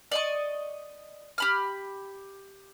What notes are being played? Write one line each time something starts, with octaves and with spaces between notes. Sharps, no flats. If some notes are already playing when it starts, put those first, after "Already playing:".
D5 D#5 C#6
G4 B5 F6